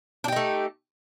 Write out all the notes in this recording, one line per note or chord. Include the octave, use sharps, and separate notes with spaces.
A3 D4 D#4 G4